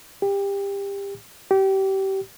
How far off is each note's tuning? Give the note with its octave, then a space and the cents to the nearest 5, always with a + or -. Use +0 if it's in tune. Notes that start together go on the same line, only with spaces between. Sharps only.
G4 +25
G4 -25